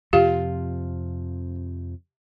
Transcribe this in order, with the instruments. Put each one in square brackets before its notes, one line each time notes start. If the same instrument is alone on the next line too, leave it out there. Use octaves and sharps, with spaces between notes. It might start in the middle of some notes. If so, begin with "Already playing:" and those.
[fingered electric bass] F2 C3 F3 [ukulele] F4 [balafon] G4